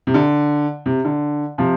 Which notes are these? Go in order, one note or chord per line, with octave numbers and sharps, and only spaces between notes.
C3
D3
C3
D3
C3 F3